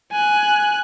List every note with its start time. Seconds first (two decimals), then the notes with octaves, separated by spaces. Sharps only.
0.12 G#5 F#6